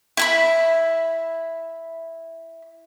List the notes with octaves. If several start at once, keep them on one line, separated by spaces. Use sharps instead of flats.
E4 E5 B5